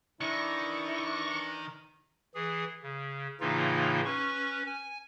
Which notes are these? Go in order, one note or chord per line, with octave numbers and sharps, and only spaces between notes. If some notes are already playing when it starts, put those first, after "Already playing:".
D#3 E3 D4 E4 C#6
E3 G#4
C#3
A2 C#3 E3 A#3 D#4 F4
C#4 B4 C#6
G#5